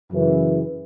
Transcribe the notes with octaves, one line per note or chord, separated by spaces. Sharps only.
F#2 C#3 E3